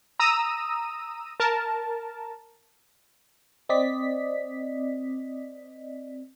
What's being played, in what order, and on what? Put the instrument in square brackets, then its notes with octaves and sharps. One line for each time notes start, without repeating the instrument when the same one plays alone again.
[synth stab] A#5 D#6 E6 D#7
A#4 A5
[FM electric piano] C4 D5 D#5 B6